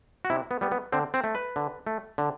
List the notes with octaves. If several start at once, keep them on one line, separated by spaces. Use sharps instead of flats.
F#4
C3 E4
B3
G3 B3
B3
D3 C4
C4
A3
B4
D3
A3
D3